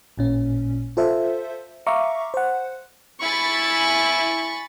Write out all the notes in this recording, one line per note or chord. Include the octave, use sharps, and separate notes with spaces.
A1 A#2 C#4
F4 A4 C5 E5
E5 F5 A#5 C#6 D6
C5 F#5
E4 G#5 B5 C#6 A6